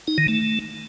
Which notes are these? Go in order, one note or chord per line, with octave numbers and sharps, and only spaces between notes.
D#4
D#3
A3